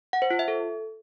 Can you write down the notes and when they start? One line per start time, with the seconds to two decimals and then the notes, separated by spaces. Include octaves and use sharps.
0.13 F#5
0.22 C5
0.31 F4
0.39 E5
0.48 A4